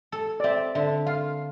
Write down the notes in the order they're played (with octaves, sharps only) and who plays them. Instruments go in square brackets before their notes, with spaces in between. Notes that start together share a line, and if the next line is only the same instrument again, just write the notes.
[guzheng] A4
[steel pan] D5
[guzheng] C4 [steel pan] E5
[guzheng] D3 [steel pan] E5
[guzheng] F4 [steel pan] F5